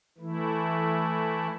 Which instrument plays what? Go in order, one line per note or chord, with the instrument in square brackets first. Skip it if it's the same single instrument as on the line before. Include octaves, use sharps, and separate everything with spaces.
[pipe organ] E3 A3 E4